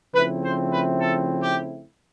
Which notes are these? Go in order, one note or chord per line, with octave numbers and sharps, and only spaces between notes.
C#3 F3 A3 C4 E4 B4
C5
B4
A4
G4